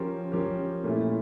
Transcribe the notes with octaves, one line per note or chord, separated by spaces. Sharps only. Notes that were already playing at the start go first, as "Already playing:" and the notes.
Already playing: F3 C#4 G4 A#4
F3 C#4 G4 A#4
A#2 A3 C#4 E4